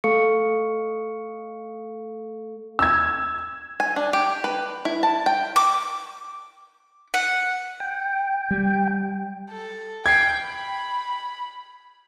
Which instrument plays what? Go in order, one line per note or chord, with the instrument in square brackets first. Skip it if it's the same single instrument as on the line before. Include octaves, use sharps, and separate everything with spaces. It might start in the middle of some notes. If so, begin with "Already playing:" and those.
[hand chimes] A3 A4 F5 C#6 C#7
[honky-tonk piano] E6 G#6
[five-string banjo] G#5
D4
G4
B4
E4
A5
G5
[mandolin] D6
F#5
[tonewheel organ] G5
[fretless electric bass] G3
[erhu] A4
[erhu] G5 [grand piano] G#6 C7
[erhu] B5